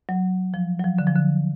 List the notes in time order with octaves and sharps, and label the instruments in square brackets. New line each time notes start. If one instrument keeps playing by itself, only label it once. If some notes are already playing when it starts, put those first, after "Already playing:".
[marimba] F#3
F3
F#3
F3
D3
F3
D3